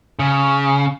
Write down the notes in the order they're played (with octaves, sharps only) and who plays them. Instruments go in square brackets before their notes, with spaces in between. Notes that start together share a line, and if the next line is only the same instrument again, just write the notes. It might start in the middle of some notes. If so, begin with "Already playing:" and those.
[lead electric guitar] C#3